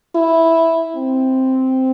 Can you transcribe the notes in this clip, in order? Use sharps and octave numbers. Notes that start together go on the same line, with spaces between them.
E4
C4